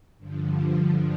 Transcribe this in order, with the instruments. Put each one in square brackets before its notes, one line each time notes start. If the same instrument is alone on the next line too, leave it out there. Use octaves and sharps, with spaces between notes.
[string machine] G2 D3 F3